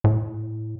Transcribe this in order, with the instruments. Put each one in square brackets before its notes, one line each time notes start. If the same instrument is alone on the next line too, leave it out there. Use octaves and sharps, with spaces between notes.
[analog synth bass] A2